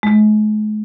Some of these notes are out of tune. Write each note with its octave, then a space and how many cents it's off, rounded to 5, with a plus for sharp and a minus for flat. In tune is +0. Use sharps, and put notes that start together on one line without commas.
G#3 +45